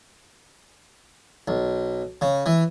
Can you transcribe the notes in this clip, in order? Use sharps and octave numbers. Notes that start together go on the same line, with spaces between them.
B1
C#3
E3